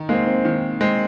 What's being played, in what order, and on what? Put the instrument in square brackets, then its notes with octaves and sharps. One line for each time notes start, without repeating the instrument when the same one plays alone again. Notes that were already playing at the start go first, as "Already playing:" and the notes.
Already playing: [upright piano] D#3 [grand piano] D#4
[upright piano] G#3 C4 [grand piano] A#3
[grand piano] C4
[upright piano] D#3
G#3 C4